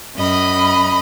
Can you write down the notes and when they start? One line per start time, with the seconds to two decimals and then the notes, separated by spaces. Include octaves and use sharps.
0.16 F#2 D#5 B5